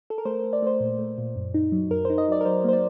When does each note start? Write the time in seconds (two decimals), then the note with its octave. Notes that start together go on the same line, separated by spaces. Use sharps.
0.10 A4
0.18 A#4
0.25 A3 C5
0.39 A3 C5
0.53 D5
0.62 A3 C5
0.80 A#2
0.98 A3
1.18 A#2
1.36 F#2
1.54 D#4
1.72 F#3
1.90 F#2 A#4
2.05 D#4 C5
2.18 D#5
2.28 F#3 D5
2.41 A#4
2.45 F#3 C5
2.64 A#3 C5
2.73 D5